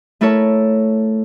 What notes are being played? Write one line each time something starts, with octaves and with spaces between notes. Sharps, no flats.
A3 E4 A4 A#4 C#5 A5